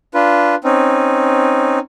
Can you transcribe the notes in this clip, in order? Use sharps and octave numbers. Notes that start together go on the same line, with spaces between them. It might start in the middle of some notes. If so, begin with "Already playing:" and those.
D4 F4 B4
C4 C#4 D#4